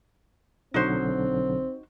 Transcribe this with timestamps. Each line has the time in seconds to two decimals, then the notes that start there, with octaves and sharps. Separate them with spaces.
0.74 B1 D3 F#3 C4 D#4 F#4 C5